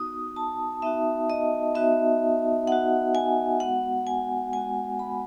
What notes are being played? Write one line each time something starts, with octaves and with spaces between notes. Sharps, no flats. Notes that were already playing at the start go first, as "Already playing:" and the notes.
Already playing: B3 D#4 F#4 D#6
A5
B3 D#4 F#4 E5
D#5
B3 D#4 F#4 E5
B3 D#4 F#4 F#5
G#5
G#3 B3 F#4 F#5
G#5
G#3 B3 F#4 G#5
B5